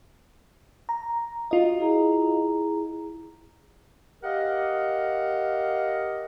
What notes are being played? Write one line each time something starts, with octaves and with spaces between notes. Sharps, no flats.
A#5
F4 F#4 D#5
E4 G#4 A#5
G4 A#4 D#5 F5 F#5